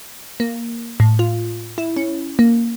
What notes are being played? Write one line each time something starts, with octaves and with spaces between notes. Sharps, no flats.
A#3
A2
F4
E4
C#4
A#3